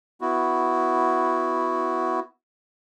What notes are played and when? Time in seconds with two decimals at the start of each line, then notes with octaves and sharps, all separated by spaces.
0.21 B3 E4 F#4